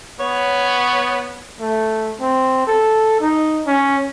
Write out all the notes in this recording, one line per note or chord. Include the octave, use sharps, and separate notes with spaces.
B3 C#5
A3
C4
A4
D#4
C#4